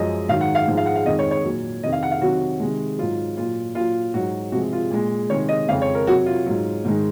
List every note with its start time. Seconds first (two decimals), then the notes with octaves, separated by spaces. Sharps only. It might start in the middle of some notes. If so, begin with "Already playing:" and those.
Already playing: F#2 F3 G#3 D#5
0.29 G#2 D#3 F#3 F5
0.41 F#5
0.55 F5
0.68 G#2 F3 G#3
0.77 F5
0.86 F#5
0.95 F5
1.06 F2 D#3 G#3 D#5
1.19 C#5
1.31 C#5
1.44 A#2 F#3
1.83 F2 C3 D#3 D#5
1.92 F5
2.03 F#5
2.11 F5
2.22 C3 D#3 F#3 F#4
2.60 C3 D#3 G#3
2.98 G#2 F#3 F4
3.37 A#2 F#3 F4
3.75 A#2 F#3 F4
4.14 G#2 F#3 F#4
4.52 C3 F3 G#3 F#4
4.73 F4
4.91 A#2 G#3
5.30 C3 D#3 G#3 C#5
5.49 D#5
5.68 F2 C#3 G#3 F5
5.82 C#5
5.95 A#4
6.07 C3 F#3 F#4
6.26 F4
6.46 G#2 F#3
6.85 G#2 D#3 G#3